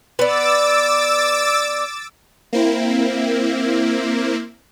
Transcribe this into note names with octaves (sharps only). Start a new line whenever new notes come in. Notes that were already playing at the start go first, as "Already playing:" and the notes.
B3 D5 D6 E6 A6
A#3 C4 E4